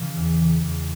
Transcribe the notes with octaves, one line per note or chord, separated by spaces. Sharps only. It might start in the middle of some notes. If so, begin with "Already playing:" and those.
Already playing: C#3 E3
E2
E3
E2